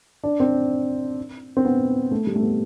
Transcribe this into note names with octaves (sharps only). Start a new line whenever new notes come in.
D4
C4
C4
B3
A3
G3
A3
B3